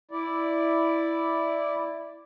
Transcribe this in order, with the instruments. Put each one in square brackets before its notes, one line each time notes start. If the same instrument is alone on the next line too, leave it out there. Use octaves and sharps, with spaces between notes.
[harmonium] E4 D5